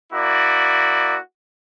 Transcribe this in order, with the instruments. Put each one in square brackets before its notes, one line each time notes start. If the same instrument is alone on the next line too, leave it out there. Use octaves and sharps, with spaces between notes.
[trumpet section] A#3 E4 F#4 D5